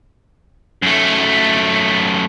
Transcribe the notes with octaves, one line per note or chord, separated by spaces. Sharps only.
F#2 A3